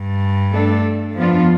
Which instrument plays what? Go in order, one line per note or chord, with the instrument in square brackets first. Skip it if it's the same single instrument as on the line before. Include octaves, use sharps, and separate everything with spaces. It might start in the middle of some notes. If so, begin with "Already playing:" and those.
Already playing: [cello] G2
[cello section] A3 D4 A4
[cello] F2 [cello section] F3 B3 D4 F4